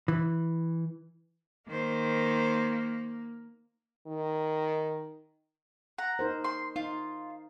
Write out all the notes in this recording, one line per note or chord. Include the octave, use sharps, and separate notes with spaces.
E3
D#3 A#3 C5
D#3
F#5 A#5
D#4 A#4 C5
C6
D#4 F4